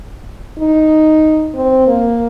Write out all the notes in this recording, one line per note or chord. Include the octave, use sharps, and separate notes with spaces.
D#4
C4
A#3